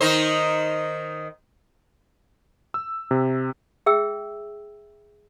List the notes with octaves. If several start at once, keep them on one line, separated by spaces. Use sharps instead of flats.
D#3 D#4 C5
E6
C3
G#4 E5 G5 E6